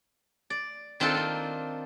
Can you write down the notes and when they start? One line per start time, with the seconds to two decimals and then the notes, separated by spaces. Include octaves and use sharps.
0.50 D5
1.00 D#3 C4 D4 F4 A4
1.14 A#3 C4